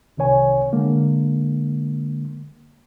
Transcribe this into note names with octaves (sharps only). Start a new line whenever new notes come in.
C2 C3 D#3 C#5 G#5
D3 G#3 A#3